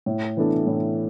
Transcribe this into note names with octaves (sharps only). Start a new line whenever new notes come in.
A2
E3 B3 D4 A4
A2